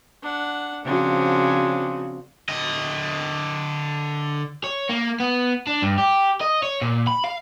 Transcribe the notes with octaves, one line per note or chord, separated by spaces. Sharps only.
D4 F#5
C#3 F3 C4 D4 F#4
D3 D#5
C#5
A#3
B3
D4
G2
G4
D#5
C#5
A#2
B5
F5